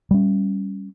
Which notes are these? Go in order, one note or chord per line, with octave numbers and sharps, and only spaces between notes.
G3 C#4